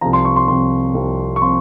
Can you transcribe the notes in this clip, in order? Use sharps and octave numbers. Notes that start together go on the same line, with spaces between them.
C2 C3 F3 A#5
C6
C#6
C6
C2 C3 F3 C6
C2 C3 F3
C#6
C3 F3 C6